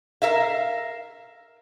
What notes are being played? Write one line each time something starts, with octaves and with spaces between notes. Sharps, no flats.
A#4 E5 F5